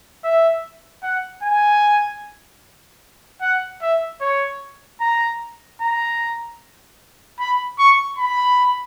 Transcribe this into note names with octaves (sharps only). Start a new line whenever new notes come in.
E5
F#5
G#5
F#5
E5
C#5
A#5
A#5
B5
C#6
B5